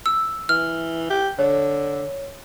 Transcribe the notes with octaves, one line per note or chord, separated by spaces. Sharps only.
E6
E3 F6
G4
D3 C#5